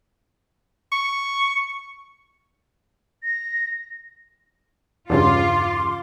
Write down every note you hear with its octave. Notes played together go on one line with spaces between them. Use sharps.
C#6
A#6
E2 G2 C#3 F4 C6 D6